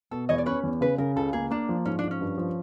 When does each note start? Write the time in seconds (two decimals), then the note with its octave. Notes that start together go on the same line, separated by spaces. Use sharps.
0.11 B2 A4
0.29 E2 C#5 D#5
0.38 D5
0.46 C#4 B4 C#5
0.63 E2
0.81 C#3 B4
0.98 C#3 A#4
1.16 C#2 A4
1.33 A#3 G#4
1.51 A#3 D4
1.69 F3
1.86 G#2 C#4
1.99 D4
2.04 F3
2.11 C#4
2.21 G2
2.38 F3